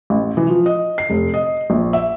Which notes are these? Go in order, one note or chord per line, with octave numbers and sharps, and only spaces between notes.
A1
E3
F3
D#5
C7
F1
D#5
A#1
E5